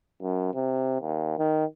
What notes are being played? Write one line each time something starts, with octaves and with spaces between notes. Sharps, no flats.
F#2
C3
D#2
D#3